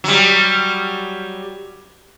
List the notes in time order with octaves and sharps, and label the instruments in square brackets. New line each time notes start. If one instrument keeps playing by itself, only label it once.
[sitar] F#3 G3